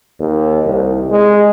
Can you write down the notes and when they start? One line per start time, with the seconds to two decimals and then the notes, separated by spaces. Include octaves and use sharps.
0.20 D#2
0.65 C2
1.11 G#3